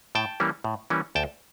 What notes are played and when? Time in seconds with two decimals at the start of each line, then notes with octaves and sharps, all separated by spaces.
0.15 A2 G5 A5
0.40 E3 G3 A#3 C#4
0.64 A2
0.90 E3 G3 A#3 C#4
1.15 D2 G5 A5